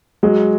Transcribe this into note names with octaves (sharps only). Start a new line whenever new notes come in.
F#3 G#3